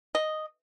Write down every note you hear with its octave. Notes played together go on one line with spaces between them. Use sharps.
D#5